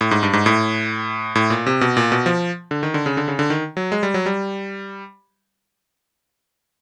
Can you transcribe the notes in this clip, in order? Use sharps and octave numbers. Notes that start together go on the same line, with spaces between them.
A2
G#2
G2
G#2
A2
A2
A#2
C3
B2
A#2
B2
F3
D3
D#3
D3
C#3
D3
C#3
D3
D#3
F#3
G#3
G3
F#3
G3